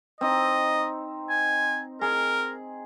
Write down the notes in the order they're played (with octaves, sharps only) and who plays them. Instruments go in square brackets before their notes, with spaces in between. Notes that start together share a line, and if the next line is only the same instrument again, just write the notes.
[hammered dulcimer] C4 D#4 [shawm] D#5
[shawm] G#5
[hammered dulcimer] G#4 [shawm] A#4